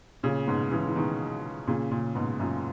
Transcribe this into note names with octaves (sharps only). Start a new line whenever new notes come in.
A#2 C#3
G#2 B2
C#3 E3
E3
B2 D#3
A#2 C#3
A#2 C#3
G#2 B2
F#2 A#2